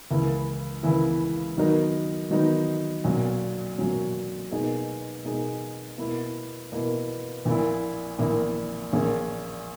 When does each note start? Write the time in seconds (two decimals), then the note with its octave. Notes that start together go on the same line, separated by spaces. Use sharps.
0.10 C#2 C#3 E3 A#3 E4
0.83 C#2 C#3 E3 A#3 E4
1.57 D#3 F#3 B3 D#4 A#4
2.31 D#3 F#3 B3 D#4 A#4
3.04 B1 A#2 F#3 C#4
3.78 B1 A#2 F#3 C#4
4.51 B2 A#3 D#4 G#4
5.24 B2 A#3 D#4 G#4
5.98 B2 A#3 E4
6.72 B2 A#3 E4
7.45 A#1 A#2 A#3 E4
8.18 A#1 A#2 A#3 E4
8.92 A#1 A#2 A#3 C#4 G#4